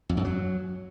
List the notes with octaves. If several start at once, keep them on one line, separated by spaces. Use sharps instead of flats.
F2
F#2
F#3